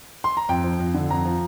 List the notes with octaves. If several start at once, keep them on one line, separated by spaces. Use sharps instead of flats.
C6
A#5
F2 G5
F3
F2
D3
F2 A#5
F3